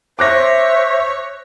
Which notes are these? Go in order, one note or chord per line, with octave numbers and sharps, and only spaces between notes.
C5 C#5 E5 D6 F#6 A#6